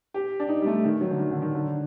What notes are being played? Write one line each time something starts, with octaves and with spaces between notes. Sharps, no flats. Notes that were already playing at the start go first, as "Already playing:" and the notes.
G4
D4
D#4
G3
A3
D#3
F#3
D3
D#3
D3
D#3
D3